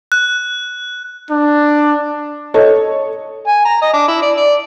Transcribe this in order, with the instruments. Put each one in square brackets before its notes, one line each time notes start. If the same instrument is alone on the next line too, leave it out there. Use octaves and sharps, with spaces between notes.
[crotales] F#6
[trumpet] D4
[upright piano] A4 C#5 D#5
[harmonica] G#5
A#5
D#5
D4
E4
D5
D5